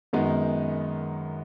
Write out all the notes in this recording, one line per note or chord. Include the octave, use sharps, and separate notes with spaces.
F#2 D#3 G#3 B3 D#4